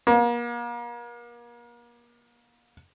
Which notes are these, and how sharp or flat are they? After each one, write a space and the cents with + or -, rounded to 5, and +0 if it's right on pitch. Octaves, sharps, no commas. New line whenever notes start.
A#3 +35